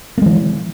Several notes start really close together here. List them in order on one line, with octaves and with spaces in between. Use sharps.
A#3 G#3 E3